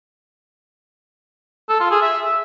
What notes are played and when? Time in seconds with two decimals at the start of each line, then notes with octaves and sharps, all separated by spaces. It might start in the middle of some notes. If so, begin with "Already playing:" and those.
1.69 A4
1.80 F4
1.91 G#4
2.02 E5